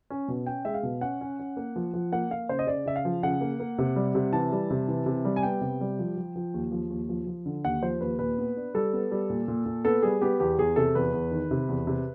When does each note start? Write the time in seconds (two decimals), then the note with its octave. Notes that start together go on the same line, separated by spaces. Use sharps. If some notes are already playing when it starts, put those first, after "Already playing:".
0.10 C#4
0.28 B2
0.46 C#4 G5
0.65 G#3 E5
0.74 F5
0.83 B2
1.01 C#4 F#5
1.21 C#4
1.39 C#4
1.57 A#3
1.76 F3
1.94 F3
2.12 A#3 F#5
2.30 A#3 F5
2.49 C#3 C5
2.59 D#5
2.67 C#3 D5
2.86 C#3 E5
2.96 F5
3.05 F3
3.23 C#3 F#5
3.41 A#3
3.60 A#3
3.78 C3
3.96 G3
4.15 C3
4.33 E3 A5
4.52 G3
4.70 C3
4.88 E3
5.06 C3
5.25 G3
5.36 G#5
5.43 B3 G5
5.61 C3
5.81 G3
5.99 F3
6.17 F3
6.36 F3
6.54 D#2
6.72 F3
6.90 D#2
7.09 F3
7.27 F3
7.46 D3
7.64 D#2 F#5
7.82 F3 C5
8.01 D#2 B4
8.19 A#2 B4
8.38 B3
8.56 D4
8.74 G3 A4
8.93 B3
9.11 G3
9.30 A#2
9.48 A#2
9.66 A#2
9.85 B3 A4
10.03 G3 G#4
10.22 B3 G4
10.40 E2 G4
10.58 E2 G#4
10.76 C3 A4
10.95 E2 B4
11.13 E2
11.31 D#3
11.51 C3
11.69 E2
11.87 C3